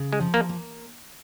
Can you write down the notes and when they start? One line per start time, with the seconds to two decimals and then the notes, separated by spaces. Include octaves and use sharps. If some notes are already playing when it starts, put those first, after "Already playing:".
Already playing: C#3
0.13 G#3
0.20 F3
0.34 A#3
0.49 A#3